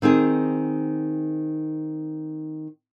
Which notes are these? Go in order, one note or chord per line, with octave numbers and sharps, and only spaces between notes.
D#3 C4 D#4 G#4